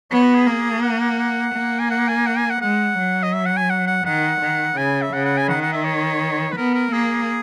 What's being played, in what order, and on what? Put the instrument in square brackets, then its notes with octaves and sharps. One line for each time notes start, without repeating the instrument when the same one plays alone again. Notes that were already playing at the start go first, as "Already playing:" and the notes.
[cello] B3 [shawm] C#5
[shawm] F#4
G#4
[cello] A#3
[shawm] F#5
F#5
F#5
[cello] A#3
[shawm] G#5
F#5
G#5
F#5
G#5
F#5
[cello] G#3 [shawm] F#5
[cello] F#3
[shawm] D#5
E5
F#5
G#5
F#5
F#5
[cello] D#3 [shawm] F#5
[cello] D#3
[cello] C#3 [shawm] G#5
[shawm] E5
[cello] C#3 [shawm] F#5
[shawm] F#5
G#5
[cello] D#3 [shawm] F#5
[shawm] F#5
E5
C#5
B4
[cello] B3 [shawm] A#4
[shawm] A#4
[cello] A#3 [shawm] G#4